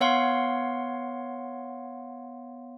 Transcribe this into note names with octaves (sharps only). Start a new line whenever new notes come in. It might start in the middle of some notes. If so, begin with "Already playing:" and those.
B3 C#5 F5 F#5 C6